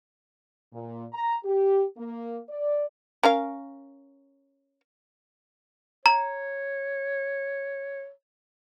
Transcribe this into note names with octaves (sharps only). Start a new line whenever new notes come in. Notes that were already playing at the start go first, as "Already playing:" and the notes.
A#2
A#5
G4
A#3
D5
C#4 A#4 F5
C#5 A#5